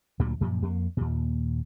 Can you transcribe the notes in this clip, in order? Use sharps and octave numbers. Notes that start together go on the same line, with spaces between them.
D2 A#2 D3 F#3
F#2 A#2 F3
F2 A#3
D#2 A#2